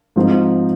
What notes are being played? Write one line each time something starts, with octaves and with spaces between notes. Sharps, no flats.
G#2 F3 C4 D#4